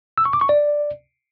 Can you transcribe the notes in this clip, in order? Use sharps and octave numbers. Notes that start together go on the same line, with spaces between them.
E6
C#6
D6
C#6
D5